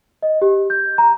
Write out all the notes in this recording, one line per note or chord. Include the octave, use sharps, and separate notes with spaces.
D#5
G4
G6
A#5